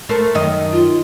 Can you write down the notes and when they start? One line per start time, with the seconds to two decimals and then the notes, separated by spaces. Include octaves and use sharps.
0.09 A3 A#4 C5
0.34 F#2 D#3 D#5
0.72 F4